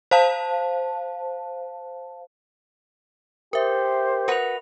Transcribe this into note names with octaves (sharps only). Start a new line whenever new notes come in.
C5 F5 A5
G4 A#4 C5 E5
F#4 A#4 B4 F7